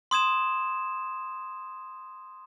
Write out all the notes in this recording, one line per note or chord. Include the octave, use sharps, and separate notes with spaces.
C6 D#6 G#6 E7